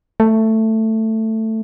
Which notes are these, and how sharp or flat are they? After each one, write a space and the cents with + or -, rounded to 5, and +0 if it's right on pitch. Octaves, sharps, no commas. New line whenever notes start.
A3 +10